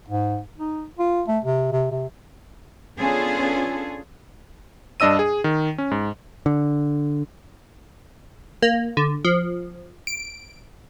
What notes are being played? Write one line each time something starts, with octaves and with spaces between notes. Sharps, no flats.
G#2
D#4
F4
A3
C3
C3
C3
B3 C#4 D4 F4 G#4 A4
G2 D4 D#5 E6 D#7
G#4
D#3
C#4
G#2
D3
A#3
D3
F3
D7